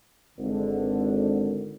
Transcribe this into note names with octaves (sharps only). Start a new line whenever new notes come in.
G#1 D3